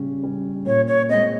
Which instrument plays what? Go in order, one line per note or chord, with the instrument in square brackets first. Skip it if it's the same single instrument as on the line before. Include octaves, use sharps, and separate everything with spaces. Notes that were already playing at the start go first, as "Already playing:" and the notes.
Already playing: [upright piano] C#3 G3 C#4
G3 C#4
[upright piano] A#2 [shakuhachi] C#5
[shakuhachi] C#5
[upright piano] G#3 C4 [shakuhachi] D#5